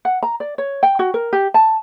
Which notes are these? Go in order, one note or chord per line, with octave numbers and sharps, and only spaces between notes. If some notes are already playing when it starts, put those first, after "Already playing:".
F#5
A#5
D5
C#5
G5
F#4
A#4
G4
A5